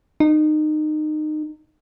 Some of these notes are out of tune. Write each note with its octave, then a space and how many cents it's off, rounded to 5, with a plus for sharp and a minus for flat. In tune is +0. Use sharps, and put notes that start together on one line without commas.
D#4 -25